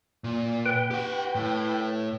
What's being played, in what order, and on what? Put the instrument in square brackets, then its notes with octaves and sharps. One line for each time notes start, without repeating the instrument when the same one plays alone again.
[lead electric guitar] A#2
[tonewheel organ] B4 G5
[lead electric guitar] G4 F#5
A2